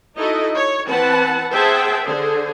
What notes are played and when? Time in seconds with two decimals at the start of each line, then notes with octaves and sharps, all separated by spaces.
0.16 D#4 E4 F#4 A4 D#5
0.56 C#5
0.88 E3 C4 B4 F#5 A5
1.53 G#4 C5 E5 F#5 G5 A5
2.04 D3 G#4 C5